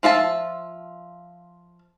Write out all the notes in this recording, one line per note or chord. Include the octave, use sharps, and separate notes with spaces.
F3 F4 E5 A5